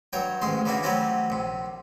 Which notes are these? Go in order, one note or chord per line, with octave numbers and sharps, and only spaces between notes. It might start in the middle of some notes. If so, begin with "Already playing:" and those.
G2 F#3 C#5 G5
A1 G#2 D#3 G#3 C6
C#3 E3 A#3 D4 F#4
F#3 G3 A3 C4 C#4 F#4
A#1 C3